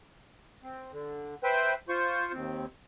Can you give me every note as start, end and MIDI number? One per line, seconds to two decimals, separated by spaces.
0.63 0.92 60
0.92 1.35 50
1.43 1.74 71
1.43 1.74 72
1.43 1.74 76
1.43 1.74 79
1.89 2.32 65
1.89 2.32 72
1.89 2.32 85
2.33 2.65 39
2.33 2.65 60